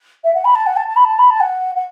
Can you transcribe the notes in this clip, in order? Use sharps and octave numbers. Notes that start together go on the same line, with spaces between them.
E5
F#5
B5
A5
F#5
A5
A5
B5
A5
B5
A5
F#5
F#5